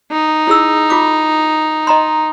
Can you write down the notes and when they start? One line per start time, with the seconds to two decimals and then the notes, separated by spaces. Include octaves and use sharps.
0.11 D#4
0.47 E4 G#4 E6
0.90 F4 D6
1.87 D#5 A#5 C6